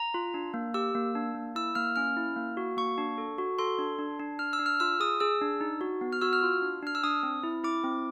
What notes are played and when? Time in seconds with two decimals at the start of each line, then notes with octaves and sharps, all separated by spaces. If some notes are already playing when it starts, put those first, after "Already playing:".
Already playing: A#5
0.14 F4
0.34 D4
0.54 A#3
0.74 G4 E6
0.95 A#3
1.15 D4
1.35 A#3
1.55 E4 E6
1.75 A#3 F6
1.96 C#4 F6
2.17 E4
2.36 A#3
2.57 F#4
2.77 A#3 C#6
2.98 D4
3.18 A4
3.38 F#4
3.59 A4 C6
3.79 D4
3.99 D4
4.20 D4
4.39 D4 F6
4.53 E6
4.59 D4
4.66 F6
4.80 F4 E6
5.00 G#4 D#6
5.20 G#4 E6
5.41 D4
5.61 D#4
5.81 F#4
6.01 B3
6.13 F6
6.21 F#4 E6
6.33 F6
6.43 F4
6.62 D4
6.83 D4 F6
6.95 E6
7.04 D4 D#6
7.23 C4
7.43 E4
7.64 E4 D6
7.84 C4